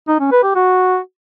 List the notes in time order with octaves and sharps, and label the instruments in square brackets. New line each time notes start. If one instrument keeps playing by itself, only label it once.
[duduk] D#4
C#4
B4
G4
F#4